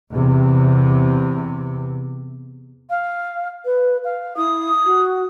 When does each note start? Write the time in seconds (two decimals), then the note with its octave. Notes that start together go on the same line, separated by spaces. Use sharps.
0.11 E2 C3
2.90 F5
3.65 B4
4.04 F5
4.37 E4 D#6
4.85 F#4